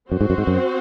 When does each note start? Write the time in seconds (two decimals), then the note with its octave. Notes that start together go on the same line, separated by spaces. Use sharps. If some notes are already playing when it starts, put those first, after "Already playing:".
0.11 F#2 C4 F#4 C5
0.21 G#2
0.30 F#2
0.38 G#2
0.47 F#2